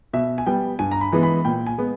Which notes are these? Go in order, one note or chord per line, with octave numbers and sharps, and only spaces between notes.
B2 E5
G#5
G3 B3 G5
G2 G#5
A#5
B5
E3 G#3 B3
B5
A#2 G5
G#5
G#3 B3